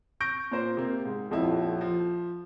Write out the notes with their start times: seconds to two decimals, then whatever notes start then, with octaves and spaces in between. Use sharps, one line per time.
0.21 C#6 G6 A#6 D7
0.51 A#2 C5
0.77 C3 A#3
1.05 G#2
1.31 D#1 F2 F3 E4
1.81 F3